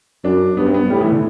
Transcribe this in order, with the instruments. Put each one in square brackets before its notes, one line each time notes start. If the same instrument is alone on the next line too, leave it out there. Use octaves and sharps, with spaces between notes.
[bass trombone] F#2 [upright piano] D4
[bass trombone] G2 [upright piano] B3
[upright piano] C4
B3
[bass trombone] A2 [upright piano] G3
[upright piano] E3
D3